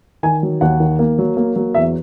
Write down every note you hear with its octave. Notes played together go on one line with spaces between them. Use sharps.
D#3 G#5
F#3
D#2 F#5
D#3
A#3
F#3
A#3
F#3
E2 E5